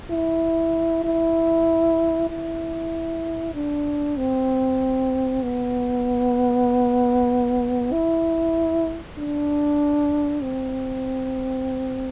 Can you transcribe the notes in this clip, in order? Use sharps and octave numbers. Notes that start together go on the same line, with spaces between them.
E4
E4
E4
D4
C4
B3
E4
D4
C4